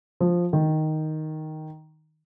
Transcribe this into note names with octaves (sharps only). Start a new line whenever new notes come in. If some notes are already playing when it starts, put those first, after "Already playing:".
F3
D#3